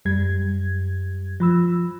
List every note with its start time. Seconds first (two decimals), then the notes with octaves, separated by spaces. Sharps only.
0.05 F#2 G3 G#6
1.40 F3 B5 E6